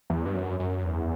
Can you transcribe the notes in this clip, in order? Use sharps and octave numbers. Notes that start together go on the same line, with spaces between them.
E2
G2
F#2
F#2
E2